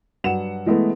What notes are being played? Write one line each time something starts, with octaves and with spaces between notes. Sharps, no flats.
G2 F#3 F#5 E7
E3 G#3 A3 B3